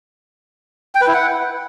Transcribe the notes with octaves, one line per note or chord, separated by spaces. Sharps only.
G5
B4
E4
F#5